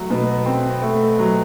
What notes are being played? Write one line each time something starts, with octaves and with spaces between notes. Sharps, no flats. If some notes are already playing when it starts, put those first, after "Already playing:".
Already playing: F#3 A3
B2
C4
A3
F#3